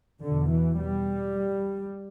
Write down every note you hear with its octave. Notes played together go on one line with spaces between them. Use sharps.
E2 B2 D3
E3
G3